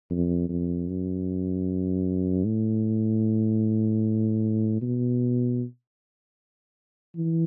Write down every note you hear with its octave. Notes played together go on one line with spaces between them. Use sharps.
F2
F2
F#2
A2
B2
E3